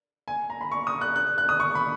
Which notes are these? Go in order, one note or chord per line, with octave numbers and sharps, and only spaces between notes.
G#5
A#5
B5
C#6
D#6
F#6
F#6
F#6
D#6
C#6
B5